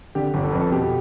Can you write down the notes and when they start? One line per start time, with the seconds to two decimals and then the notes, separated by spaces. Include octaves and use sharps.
0.15 D3 G4
0.34 G1
0.44 A4
0.52 F2 B4
0.61 A4
0.72 B2 G4